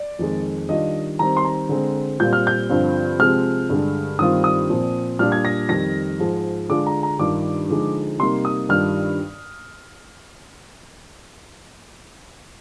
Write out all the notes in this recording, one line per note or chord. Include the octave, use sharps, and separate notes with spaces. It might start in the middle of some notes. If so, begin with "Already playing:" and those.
Already playing: D5
F2 D#3 G#3
D#3 G3 D4 F4 D#5
D#3 G3 C4 A#5
C6
A#5
D3 G#3 C4
A#2 G3 C4 F4 G6
F6
G6
G2 D3 F3 C4 F4
C3 F3 G#3 C4 F6
G2 D3 G#3 D4
G2 D#3 G3 C4 F4 D#6
D#6
A#2 F3 C4
A#2 G3 D4 F4 F6
G#6
A#6
F2 D#3 G3 A#6
G#2 F3 G#3
D3 G#3 D4 F4 D6
A#5
A#5
G2 D#3 G3 D4 F4 D6
D3 F3 G#3 D#4
C3 G3 A#3 D#4 C6
D#6
G2 D#3 G3 D4 F4 F6